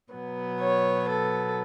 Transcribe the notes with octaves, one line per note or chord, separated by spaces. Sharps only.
B2 F#3 B3
C#5
A4